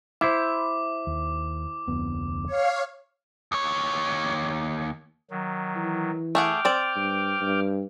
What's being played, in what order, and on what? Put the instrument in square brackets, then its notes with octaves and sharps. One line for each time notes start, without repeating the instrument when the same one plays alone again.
[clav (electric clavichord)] E4 C5 [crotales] D6
[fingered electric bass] D#2
F1 D2 B3
[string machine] C#5 F5
[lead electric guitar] D#2 C#5
[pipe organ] D#3 F#3
[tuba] E3
[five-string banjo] A3 G#4 F#5 [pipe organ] G5 D6 F6
[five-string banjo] C4 D5
[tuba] G2
G2